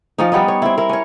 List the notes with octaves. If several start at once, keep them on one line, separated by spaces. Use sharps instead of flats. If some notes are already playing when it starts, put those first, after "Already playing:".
F3 C#4 D#4
G3 B3 C#4 D#4
C#5
C4 E4
E4 A#4
C#4 C#5